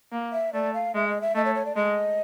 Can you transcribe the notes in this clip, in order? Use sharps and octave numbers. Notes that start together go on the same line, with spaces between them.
A#3
E5
A3 D5
F5
G#3 E5
D#5
E5
A3 D#5
C#5
C#5
D5
G#3 D#5